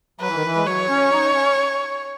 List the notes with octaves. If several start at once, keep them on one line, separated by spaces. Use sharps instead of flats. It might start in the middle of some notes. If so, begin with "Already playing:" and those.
F#3 B4
E3
D#3
E3
G#3
F#3 C#5
C#4
D#4
C#4